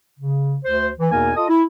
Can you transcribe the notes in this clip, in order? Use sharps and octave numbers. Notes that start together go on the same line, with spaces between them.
C#3
D2 C5
E3
E2 B2 A#3 D#4 A#4 G#5
F4 A4 D#5 D#6
E4